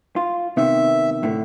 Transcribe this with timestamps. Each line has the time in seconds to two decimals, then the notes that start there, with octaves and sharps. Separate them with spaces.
0.16 F4
0.57 C3 D#3 B3 E5
1.23 A2 D3 A3